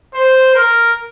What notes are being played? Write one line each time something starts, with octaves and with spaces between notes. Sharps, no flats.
C5
A#4